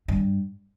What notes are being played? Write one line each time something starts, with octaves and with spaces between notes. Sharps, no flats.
G2